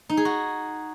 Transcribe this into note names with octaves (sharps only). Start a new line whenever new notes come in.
D#4
G#4
F#4